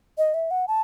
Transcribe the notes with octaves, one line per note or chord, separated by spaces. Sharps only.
D#5
E5
F#5
A5